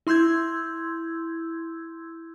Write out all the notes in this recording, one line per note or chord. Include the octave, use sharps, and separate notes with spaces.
E4 C6 E6 G6 G#6